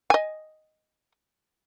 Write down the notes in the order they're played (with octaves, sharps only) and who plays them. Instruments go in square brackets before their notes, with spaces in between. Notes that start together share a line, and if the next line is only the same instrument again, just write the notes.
[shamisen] D#5 G#5